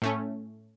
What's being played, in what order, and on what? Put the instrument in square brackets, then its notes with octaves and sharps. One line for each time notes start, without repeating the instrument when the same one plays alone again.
[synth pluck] A2 A3 C#4